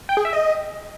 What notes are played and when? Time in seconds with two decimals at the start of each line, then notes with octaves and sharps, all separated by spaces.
0.09 G5
0.17 G#4
0.25 E5
0.33 D#5